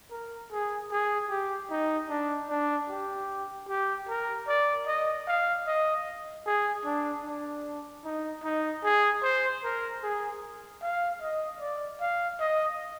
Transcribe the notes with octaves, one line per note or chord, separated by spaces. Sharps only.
A#4
G#4
G#4
G4
D#4
D4
D4
G4
G4
A#4
D5
D#5
F5
D#5
G#4
D4
D4
D#4
D#4
G#4
C5
A#4
G#4
F5
D#5
D5
F5
D#5